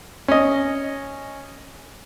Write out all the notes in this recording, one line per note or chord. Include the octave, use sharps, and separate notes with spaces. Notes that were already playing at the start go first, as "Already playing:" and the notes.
C#4 D#5